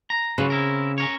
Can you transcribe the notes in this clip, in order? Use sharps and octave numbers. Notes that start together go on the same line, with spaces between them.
A#5
C#3 F#3 F4 B4
C4 E4 A#4
C#4 A#4 C#5